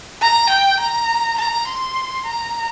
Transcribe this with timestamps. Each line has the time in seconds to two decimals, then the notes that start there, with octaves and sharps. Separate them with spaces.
0.21 A#5
0.50 G5
0.80 A#5
1.38 A#5
1.68 C6
2.27 A#5